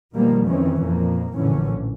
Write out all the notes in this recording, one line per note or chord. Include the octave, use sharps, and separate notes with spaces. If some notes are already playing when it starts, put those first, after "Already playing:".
B2 D#3 F3 G3 G#3 A#3
F2 D#3 E3 C4 C#4
F2 A#2 A#3
A#1 F#2 A2 D3 E3 C#4